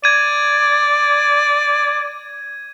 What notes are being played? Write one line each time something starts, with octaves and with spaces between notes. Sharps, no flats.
D5 G#6 D#7